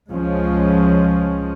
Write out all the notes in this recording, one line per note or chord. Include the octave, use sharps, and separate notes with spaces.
C#2 F3 G#3 C#4